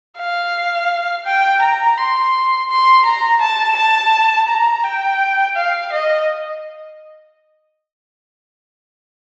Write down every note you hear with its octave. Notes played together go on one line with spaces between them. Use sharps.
F5
G5
A#5
C6
C6
A#5
A5
A5
A#5
G5
F5
D#5